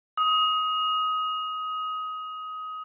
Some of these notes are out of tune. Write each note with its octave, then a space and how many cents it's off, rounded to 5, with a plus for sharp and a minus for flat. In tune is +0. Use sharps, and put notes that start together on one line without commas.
D#6 +20